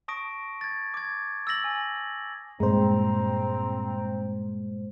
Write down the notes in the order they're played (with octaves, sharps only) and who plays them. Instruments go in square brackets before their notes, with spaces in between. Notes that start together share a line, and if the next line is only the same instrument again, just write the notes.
[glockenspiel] A5 C#6 D#6 A#6 D7
G#6 A6
D6 G#6
E6 A6 A#6 F#7
G#5
[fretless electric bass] G2 A#2 [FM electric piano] G#3 C5 [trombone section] C4 [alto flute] A#5